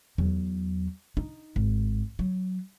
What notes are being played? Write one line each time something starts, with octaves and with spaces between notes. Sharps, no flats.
E2 F#3
D#4
G#1
F#3